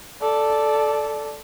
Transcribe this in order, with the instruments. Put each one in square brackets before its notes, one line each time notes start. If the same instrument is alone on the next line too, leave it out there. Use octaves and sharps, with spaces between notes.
[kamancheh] A4 D5